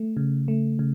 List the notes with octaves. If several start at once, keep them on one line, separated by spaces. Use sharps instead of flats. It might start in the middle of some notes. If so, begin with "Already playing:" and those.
Already playing: A3
C#3
A3
C#3